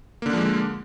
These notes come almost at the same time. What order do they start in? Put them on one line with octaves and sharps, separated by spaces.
A#3 D3 D4 F3 G#3